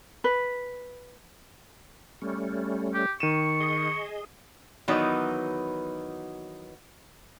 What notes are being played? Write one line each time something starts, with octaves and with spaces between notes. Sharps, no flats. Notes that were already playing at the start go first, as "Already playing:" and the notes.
B4
G3 A3 C#4
G4
D#3 C#6 D#7 E7
G#4 D#5
D#3 E3 F#3 B3 D#4